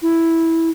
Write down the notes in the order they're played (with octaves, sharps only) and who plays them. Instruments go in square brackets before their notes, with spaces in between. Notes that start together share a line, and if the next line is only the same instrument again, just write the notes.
[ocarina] E4